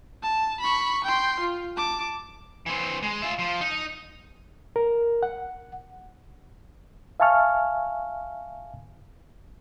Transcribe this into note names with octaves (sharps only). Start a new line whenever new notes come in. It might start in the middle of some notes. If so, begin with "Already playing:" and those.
A5
B5 C#6
G5 C6
F4
A5 D6
E3 C4
G#3
F4 E5
F3
D#4
A#4
F#5
E5 F5 G#5 A5 C#6 F6